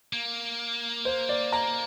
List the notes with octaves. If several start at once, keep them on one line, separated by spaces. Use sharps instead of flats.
A#3
C5
D5
A#5